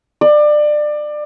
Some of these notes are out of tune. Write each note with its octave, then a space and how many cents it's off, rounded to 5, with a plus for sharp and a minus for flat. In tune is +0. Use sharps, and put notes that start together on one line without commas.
D5 +25